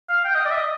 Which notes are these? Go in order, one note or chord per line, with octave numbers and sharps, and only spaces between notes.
F5
G5
D#5
D5
E5
D#5